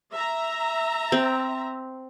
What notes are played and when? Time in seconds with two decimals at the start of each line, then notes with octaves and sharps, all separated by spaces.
0.12 E5 A#5
1.12 C4